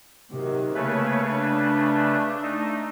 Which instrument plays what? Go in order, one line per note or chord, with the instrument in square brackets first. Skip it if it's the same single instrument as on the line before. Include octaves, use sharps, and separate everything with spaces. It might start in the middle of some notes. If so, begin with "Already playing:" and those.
[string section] C3 D#3 F#3
[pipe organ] C#3 A3 B4 [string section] A#3 C#5
[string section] D4
[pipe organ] A3 D#4